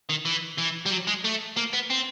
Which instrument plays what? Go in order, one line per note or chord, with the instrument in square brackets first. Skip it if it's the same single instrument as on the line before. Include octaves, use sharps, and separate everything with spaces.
[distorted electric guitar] D#3
E3
E3
G3
F#3
G#3
A3
A#3
B3
C4